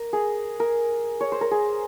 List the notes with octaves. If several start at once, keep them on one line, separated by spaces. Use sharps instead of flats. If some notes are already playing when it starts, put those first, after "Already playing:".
Already playing: A#4
G#4
A#4
C#5
C5
A#4
G#4